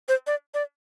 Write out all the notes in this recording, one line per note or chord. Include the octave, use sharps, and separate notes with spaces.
C5
D5
D5